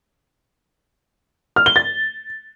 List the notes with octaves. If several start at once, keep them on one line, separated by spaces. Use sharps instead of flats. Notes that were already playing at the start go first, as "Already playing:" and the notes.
F6
G7
A6